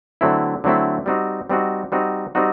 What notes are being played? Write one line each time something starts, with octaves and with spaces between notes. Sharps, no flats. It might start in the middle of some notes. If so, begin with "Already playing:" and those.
D3 F#3 A3 C4 E4
D3 F#3 A3 C4 E4
G3 C4 D#4 F#4
G3 C4 D#4 F#4
G3 C4 D#4 F#4
G3 C4 D#4 F#4